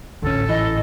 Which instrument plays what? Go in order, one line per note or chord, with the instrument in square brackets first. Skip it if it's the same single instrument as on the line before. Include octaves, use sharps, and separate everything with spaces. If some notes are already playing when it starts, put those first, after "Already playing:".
[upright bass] A1 G#2 [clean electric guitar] D2 C#4 [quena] A4
[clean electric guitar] E3 [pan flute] D#5